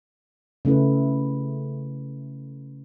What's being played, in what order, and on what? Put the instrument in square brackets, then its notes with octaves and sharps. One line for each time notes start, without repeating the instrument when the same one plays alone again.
[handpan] C#3 A3 C#4 E4 B4